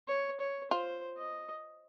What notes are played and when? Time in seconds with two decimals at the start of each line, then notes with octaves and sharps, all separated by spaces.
0.08 C#5
0.40 C#5
0.71 F4 C5
1.18 D#5